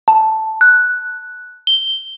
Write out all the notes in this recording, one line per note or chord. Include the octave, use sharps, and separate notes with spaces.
A5
F#6
G7